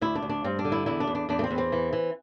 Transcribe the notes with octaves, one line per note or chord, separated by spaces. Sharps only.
D2 E4
D4
D2
D4
G2 C4
D4
D3
E4
E2 E4
D4
E2
D4
E2 D4
A3
C4
E2
C4
E3
E3